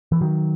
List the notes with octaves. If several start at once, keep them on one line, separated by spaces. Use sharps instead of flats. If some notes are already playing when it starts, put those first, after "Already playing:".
E3
D#3 F#3